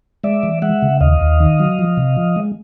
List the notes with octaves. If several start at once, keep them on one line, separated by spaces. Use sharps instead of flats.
G#3 D5 E5
E3
G#3 E5 F#5
C#3
D#2 D#5 F5
D#2
D#3
F#3
F3
C3
F3
G#3